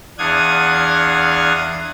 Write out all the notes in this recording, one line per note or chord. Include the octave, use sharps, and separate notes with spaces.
E2 D4 F5 F#5 D#6 G#6